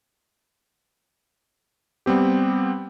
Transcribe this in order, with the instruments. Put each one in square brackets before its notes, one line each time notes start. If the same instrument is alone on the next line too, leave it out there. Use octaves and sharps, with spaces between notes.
[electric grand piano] G3 B3 C4 G4